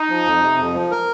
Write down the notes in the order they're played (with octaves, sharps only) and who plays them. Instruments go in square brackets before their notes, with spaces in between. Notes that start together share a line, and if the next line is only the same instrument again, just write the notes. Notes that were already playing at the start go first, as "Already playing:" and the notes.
Already playing: [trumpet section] D#4
[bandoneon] F3
F2
C3
F2
F3
A#4